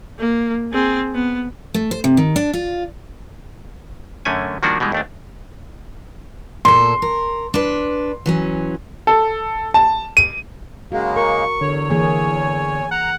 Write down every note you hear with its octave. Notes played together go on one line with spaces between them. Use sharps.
A#3
C4 G#4
B3
A3
C5
C3
D#3
D4
F4
F#2 D3 A3 C#4 G#5
D#3 F3 G3 A#3 D4 F#4
B2 E3 G3 G#3
D#2 A3 D4
A#2 A4 C6
A#4
D4 B4
E3 F#3 C#4
A4
A5
D#7
C#3 G#3 A#3 F#4
A#4 C#6
E2 D3 C#5
E3 A#3 G#4 G#5
F#5 A#5